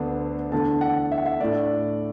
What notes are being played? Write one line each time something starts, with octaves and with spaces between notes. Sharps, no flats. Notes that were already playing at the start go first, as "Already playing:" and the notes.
Already playing: D2 D3 B3 D4
E2 D3 A3 D4 A5
F#5
E5
F#5
E5
A2 A3 D4 D5